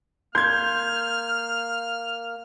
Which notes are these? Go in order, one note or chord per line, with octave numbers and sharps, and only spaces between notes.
A#3 C6 F6 G6 G#6